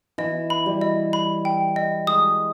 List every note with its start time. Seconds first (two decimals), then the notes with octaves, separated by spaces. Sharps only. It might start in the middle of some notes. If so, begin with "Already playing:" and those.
0.18 E3 D#5
0.50 B5
0.66 G3
0.81 D#5
1.13 B5
1.45 G5
1.76 D#5
2.07 G#3 D#6